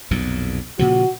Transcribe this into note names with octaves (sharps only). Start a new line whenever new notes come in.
B1 F2 A#2
A#2 C#3 F3 F#4